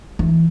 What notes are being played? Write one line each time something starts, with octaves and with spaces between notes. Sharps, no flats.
E3